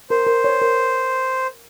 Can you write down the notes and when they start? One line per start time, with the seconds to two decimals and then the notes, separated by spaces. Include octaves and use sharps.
0.10 A#4 C5
0.27 A#4
0.44 C#5
0.61 A#4